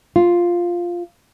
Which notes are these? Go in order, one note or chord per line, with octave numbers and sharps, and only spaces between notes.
F4